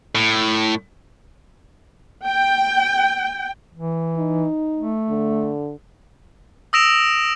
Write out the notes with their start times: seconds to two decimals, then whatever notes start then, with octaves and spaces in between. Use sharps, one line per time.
0.15 A2
2.25 G5
3.75 E3
4.17 D#4
4.77 A3
5.09 D3
6.73 D#6 E6 A#6 D7 E7 F7